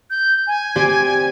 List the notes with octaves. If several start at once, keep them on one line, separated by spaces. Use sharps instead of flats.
G6
G#5
C4 G4 D5